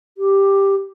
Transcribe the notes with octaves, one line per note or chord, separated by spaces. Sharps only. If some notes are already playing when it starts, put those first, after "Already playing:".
G4